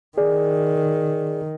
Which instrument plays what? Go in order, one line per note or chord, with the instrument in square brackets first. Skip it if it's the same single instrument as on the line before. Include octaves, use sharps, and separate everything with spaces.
[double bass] D#3 [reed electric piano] G#4 D5